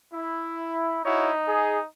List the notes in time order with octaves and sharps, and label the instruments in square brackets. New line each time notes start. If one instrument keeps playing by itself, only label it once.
[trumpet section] E4
[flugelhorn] D#4 [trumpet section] E4 F#4 C#5
[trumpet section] G#4